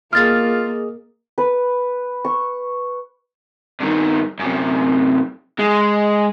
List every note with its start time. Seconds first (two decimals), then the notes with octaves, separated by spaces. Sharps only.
0.13 A#3 F4 G#4 D#5 D#6 F6 A6
1.38 B4
2.25 C#6
3.81 G2 D#3
4.39 F#2 C3
5.59 G#3